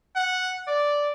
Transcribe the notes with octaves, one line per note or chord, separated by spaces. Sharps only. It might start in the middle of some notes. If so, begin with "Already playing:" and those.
F#5
D5